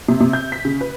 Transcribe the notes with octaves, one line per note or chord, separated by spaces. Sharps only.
C3
C3
G6
B6
C#3
B4